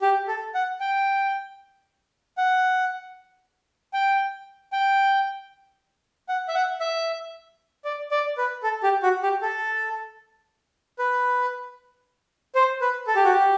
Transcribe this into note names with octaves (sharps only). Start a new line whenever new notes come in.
G4
A4
F#5
G5
F#5
G5
G5
F#5
E5
F#5
E5
D5
D5
B4
A4
G4
F#4
G4
A4
B4
C5
B4
A4
G4
F#4
G4